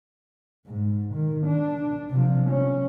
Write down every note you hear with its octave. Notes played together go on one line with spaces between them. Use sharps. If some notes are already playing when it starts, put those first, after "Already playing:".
G#2
D#3
D4
C3 F3
C#4